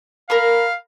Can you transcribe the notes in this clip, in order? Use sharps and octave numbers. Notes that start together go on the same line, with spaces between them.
A#4 F5 A#5 B5